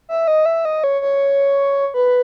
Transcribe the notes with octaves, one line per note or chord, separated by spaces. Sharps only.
E5
D#5
E5
D#5
C#5
C#5
B4